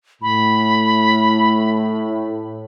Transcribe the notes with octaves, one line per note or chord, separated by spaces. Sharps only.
A2 B5